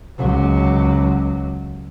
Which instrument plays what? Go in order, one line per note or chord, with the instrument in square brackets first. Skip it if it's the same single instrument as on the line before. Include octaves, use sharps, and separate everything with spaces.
[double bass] C#2 F#3